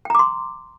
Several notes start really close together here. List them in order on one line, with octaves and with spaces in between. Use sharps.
G5 A#5 D6 C6